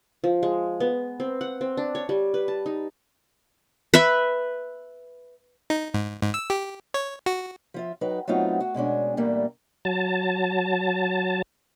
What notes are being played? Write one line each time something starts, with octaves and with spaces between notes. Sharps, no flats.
F3
G#3
B3
C4
F#5
C4
D4
C#5
G3
B4
A5
D#4
B4 E5
D#4
G#2
G#2
E6
G4
C#5
F#4
F3 F4 E5
F#3 D#4 B4 G5
F#3 A3 B3 C4 D#4 F4
F#4
B2 G#3 C#4 D4
E2 G2 A#2 G3 A3 A#3
F#3 A5